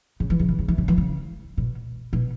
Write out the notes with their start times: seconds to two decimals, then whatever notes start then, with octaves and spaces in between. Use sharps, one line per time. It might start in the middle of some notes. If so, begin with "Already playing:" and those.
0.20 C#3
0.30 E3
0.39 C#3
0.49 E3
0.59 C#3
0.68 E3
0.78 C#3
0.88 E3
0.98 C#3
1.57 B2
2.13 B2